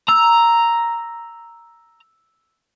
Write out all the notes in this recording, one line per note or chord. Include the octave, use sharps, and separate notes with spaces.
A#5 E6